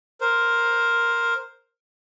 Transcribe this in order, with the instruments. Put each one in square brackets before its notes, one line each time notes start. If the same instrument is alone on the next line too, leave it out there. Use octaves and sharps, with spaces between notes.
[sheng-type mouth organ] A#4 C5